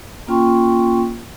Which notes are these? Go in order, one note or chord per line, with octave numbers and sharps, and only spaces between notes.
A#3 C#4 F4 G5 C6 C#6